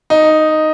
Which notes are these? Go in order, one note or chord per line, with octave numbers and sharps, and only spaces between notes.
D#4